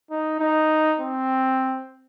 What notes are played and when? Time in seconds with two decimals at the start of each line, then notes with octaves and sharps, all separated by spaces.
0.11 D#4
0.40 D#4
1.00 C4